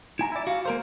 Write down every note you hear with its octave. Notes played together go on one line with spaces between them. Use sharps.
E4 G#5 A#5
E4 D5
F#4 F5
A#3 A#4 C5